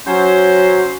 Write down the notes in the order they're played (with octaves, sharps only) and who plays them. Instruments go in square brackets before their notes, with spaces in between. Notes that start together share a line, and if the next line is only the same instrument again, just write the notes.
[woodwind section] F#3 C#4 C5